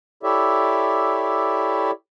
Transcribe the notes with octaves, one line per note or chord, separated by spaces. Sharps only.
E4 G4 A4 C#5 D5 E5